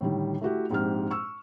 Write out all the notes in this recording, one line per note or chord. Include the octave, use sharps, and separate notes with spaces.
A2 D3 D#3 G3
A3 E4 F#4 G4
A#1 G#2 C4 G4 F6
C#6 E6